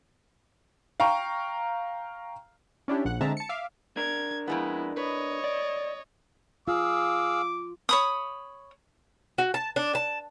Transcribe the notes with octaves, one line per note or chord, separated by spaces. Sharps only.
F5 G5 A#5 C#6
C#4 D4 E4 G4
A#1 F#5 F#6
D3 G#3 C4 E5 A5 A#5
A5 C#7
E5 F5 D6
D4 A#4 G#6
F2 G#3 B3 E4
B4 C#5 D#5
D5
F4 G#4 F5 D6 E6
C#5 B5 D#6
F#4
A5
D4
A5